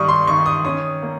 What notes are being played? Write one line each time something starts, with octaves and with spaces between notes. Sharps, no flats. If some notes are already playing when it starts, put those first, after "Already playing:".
Already playing: G2 D#3 G3 C#6 D#6
C6
D#3 C#6
D#6
C#4 D#6
A#3